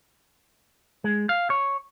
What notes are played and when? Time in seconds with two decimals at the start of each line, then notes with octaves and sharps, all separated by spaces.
1.04 G#3
1.29 F5
1.50 C#5